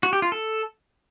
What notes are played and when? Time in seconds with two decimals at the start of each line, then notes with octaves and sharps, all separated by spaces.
0.03 F#4
0.13 G4
0.22 F4
0.32 A4